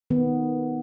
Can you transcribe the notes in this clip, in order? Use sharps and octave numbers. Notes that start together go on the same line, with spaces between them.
D#3 B3